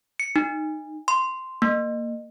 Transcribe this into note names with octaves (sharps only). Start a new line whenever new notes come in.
C#7
D#4
C6
A#3